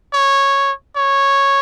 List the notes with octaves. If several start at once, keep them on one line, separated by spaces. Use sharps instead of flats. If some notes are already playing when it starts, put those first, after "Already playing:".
C#5
C#5